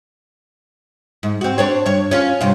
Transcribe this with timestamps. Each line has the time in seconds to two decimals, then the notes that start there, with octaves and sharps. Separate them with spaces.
1.23 G#2
1.41 C4 F#4
1.58 D4 C5 C#5
1.86 G2 C#5
2.11 C#4 F4
2.41 G2 C3